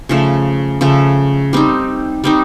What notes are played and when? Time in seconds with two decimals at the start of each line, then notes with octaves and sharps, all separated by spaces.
0.09 C#3 F3 A3
0.81 C#3 F3 A3
1.53 G3 C4 D#4
2.24 G3 C4 D#4